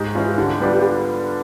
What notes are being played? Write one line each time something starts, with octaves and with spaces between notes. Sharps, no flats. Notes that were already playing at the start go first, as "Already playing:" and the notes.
Already playing: G#2 G4
E3 G#3 C#4 F4
D3 G4
G3 B3 D4 F4